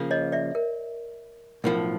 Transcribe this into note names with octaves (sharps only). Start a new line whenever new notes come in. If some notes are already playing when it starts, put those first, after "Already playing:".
Already playing: C#3 F3 A#3
C#5 D#5
D5 E5
A#4
B1 A2 F3 A#4